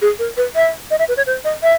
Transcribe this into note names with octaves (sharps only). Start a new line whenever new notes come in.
G#4
A#4
B4
E5
D#5
E5
B4
C#5
C5
D#5
E5